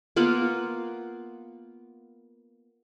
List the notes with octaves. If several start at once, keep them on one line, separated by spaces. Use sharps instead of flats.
A#3 B3 F4 F#5